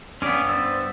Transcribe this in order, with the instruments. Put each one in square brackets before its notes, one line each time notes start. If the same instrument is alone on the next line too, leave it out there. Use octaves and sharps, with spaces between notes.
[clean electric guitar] G2 B3 [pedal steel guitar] C#4 D5
[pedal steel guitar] C5 D5 E6